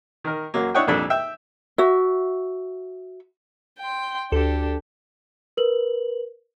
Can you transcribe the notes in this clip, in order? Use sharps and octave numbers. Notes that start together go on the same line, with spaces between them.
D#3 A#4
F#2 F#3 A#3
D4 E4 C#5 D#5 F#5 G5
C2 F2 A#2 D4 A4 B5
E5 G5 E6
F#4 E5
G5 C6
D2 D4 G4 A4
A#4 B4 F#7